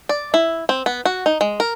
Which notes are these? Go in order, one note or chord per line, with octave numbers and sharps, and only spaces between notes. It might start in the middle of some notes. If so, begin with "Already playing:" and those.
D5
E4
C4
B3
F#4
D#4
G#3
A#4